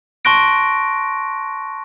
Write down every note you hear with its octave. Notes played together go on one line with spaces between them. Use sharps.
A5 C6 C#6 F#6 A#6 D7